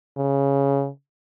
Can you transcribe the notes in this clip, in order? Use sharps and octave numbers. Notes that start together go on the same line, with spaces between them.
C#3